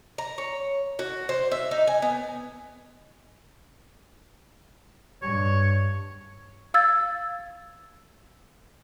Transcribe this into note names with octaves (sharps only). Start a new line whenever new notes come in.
A#5
C#5
F#4
C5
E5
D#4
G#5
B3
G2 C#5
F5 E6 G#6 A6